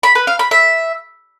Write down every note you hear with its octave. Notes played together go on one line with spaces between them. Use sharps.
B5
B4
F5
B5
E5